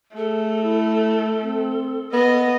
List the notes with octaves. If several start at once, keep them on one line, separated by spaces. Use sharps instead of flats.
A3 G#4 A4
E4
C4
A#3 B3 D#5